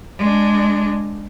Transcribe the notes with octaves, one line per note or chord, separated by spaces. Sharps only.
G#3 D4